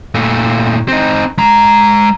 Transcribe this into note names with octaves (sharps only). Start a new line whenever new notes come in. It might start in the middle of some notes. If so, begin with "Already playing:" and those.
A#2 A3
C4 D#4
G#3 A#5